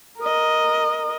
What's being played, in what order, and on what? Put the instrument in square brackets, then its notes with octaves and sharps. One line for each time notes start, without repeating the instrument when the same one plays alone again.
[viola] A#4 D#5